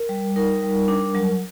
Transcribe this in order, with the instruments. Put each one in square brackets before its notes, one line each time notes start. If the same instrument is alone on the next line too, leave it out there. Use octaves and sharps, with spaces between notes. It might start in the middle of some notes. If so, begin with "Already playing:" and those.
Already playing: [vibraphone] A#4
G3
D#4 A#4
G3
D4
F#3